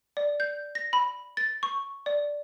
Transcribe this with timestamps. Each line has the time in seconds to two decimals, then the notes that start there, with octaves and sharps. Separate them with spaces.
0.17 D5
0.40 G6
0.75 A#6
0.93 B5
1.37 A6
1.63 C#6
2.06 D5